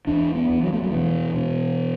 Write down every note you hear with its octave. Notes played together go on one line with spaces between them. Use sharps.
E2 D4
B3
E2
F#3
A3
F#3
B2 E3
B2